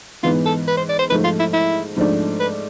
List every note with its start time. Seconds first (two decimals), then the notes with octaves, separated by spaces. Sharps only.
0.23 G#2 E3 B3 F4
0.46 A4
0.67 B4
0.77 C5
0.89 D5
0.99 C5
1.10 G#2 F3 A3 B4
1.24 F4
1.39 E4
1.53 E4
1.96 G#2 F3 A3 D4
2.40 B4